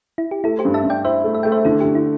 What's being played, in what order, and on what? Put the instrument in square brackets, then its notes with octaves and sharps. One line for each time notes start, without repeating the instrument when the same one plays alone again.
[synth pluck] E4
G4
[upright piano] A3 [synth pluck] E4 A4
[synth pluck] G4 C5
[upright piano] G2
[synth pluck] E5 A5
[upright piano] G2
[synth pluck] D5 G5
[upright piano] E4 [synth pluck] C5 E5
[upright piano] A3
[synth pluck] E5
[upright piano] A3 [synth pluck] G5
[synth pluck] C5 E5
[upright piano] D3 [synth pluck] E4 A4
[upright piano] D3 [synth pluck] G4
[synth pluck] E4